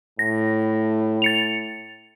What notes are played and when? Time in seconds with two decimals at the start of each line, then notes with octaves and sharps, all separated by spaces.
0.19 A2 A#6
1.22 A6 C#7 F7